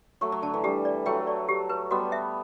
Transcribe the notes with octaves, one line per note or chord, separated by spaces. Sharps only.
F#3 A3 C#6
F#3
D3 A5
E3
G3 G4
D5
F#3 A3 G5
D5
G4
B4
G3 B3 F#4
E5